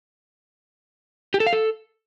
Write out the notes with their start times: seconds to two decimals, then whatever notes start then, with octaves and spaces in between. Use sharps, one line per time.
1.34 G4
1.40 A4
1.46 F5
1.53 A4